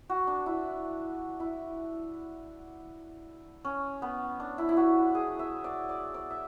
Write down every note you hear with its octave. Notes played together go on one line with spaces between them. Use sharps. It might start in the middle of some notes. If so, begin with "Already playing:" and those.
F#4
D4
E4
E4
C#4
B3
D4
E4
E4
F#4
G#4
E5
D5
D5
D5
E5